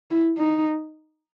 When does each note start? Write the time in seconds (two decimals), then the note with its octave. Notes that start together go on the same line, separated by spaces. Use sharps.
0.11 E4
0.38 D#4